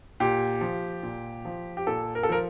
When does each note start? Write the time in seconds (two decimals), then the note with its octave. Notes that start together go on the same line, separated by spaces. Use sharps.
0.20 A#2 G4
0.61 F3
1.03 A#2
1.45 F3
1.77 G4
1.87 A#2 A4
2.15 A#4
2.23 A4
2.29 F3 A#4